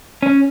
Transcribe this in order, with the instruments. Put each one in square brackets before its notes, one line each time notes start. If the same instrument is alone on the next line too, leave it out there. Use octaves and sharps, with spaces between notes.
[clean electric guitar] C#4